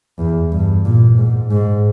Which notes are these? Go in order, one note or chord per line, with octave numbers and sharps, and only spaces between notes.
E2
G2
A#2
G#2
G#2